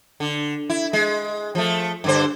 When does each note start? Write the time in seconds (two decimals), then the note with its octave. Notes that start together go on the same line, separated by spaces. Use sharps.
0.20 D3
0.70 E4
0.93 G#3
1.55 F3 A3
2.04 G2 D3 C5